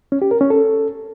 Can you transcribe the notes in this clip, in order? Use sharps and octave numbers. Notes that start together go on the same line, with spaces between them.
C#4
G4
A#4
C#4
A4